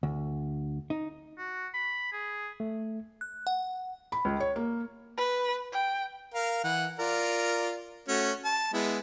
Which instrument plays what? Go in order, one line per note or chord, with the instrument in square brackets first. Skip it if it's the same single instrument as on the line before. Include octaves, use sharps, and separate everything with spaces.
[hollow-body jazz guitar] D2
D#4
[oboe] F#4
B5
G#4
[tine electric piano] A3
[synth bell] F#6
F#5
[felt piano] B5
C#2
C#5
A#3
[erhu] B4
G5
[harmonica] A#4 F5
E3 F#5
F4 A#4 D5
A3 C#4 F#4
A5
G#3 B3 E4